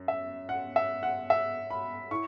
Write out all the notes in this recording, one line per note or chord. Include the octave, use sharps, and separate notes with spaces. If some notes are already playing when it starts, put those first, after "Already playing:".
Already playing: F#2
E5
F#5
E5
F#5
E5
B5
E4 C#6